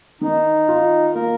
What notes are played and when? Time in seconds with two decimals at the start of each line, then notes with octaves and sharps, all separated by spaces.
0.21 D#3 D#4
0.68 F4
1.15 A#3 A#4